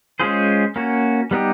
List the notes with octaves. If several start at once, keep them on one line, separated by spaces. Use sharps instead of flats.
G#3 C#4 F4 G#4 C5
A#3 C#4 F#4
G3 B3 D#4 G4